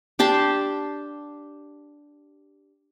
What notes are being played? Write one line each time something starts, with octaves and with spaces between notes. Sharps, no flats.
D4 G4 A5 C6